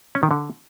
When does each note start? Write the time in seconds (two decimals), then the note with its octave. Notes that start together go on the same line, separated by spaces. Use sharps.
0.15 C#4
0.23 D#3
0.31 D3